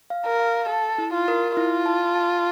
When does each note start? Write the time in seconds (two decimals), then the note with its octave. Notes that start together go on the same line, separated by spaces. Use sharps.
0.10 F5
0.26 A#4
0.40 F5
0.69 A4 A5
0.98 E4
1.14 F4
1.28 A#4
1.57 E4 F4
1.86 A5
2.15 A5